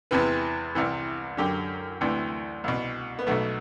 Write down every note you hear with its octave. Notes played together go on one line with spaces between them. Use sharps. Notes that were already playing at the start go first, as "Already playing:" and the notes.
E2 C3 E3 B4
C2 C3 E3
F#2 D3 G4
D2 C3 E3
C2 B2
B3
B1 B2 A3